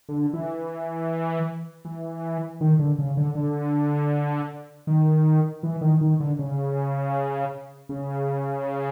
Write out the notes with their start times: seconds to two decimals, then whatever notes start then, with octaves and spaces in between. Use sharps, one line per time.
0.09 D3
0.33 E3
1.85 E3
2.61 D#3
2.79 D3
2.99 C#3
3.17 D3
3.35 D3
4.87 D#3
5.63 E3
5.81 D#3
6.01 D#3
6.20 D3
6.39 C#3
7.89 C#3